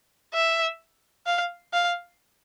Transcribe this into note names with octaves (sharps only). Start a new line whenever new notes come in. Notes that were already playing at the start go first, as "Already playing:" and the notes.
E5
F5
F5